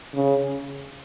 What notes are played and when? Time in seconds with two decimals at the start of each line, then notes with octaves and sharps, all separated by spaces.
0.15 C#3